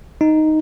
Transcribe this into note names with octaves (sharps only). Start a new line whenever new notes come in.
D#4